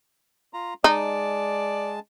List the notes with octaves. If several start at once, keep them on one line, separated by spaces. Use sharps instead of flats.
F4 A#5
G#3 D#4 D5 A5